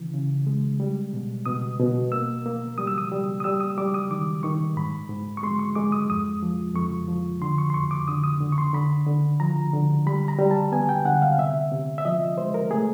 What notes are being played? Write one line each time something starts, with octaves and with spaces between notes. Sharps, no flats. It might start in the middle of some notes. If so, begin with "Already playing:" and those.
Already playing: C#3 E3
C#3
G#3
G3
B2
B2 D#6
B2
A#3 E6
A#3
G3 D#6
E6
D#6
G3
D#6
G3 E6
D#6
G3 D6
D#6
D#3 D6
D#3 C#6
G#2 B5
G#2
C#6
G#3 C6
C#6
G#3 D6
D#6
F2 D#6
F3
F2 C#6
F3
D3 C6
C#6
C6
F2 C#6
D6
D3 D#6
D#6
D3
C#6
C6
D3 B5
D3
F3 A#5
D3
G3 B5
A#5
G3
A5
B3 G#5
G5
D3 F#5
F5
C3 E5
C3
E5
F3 D#5
G#3 C5
A#4
A3 G#4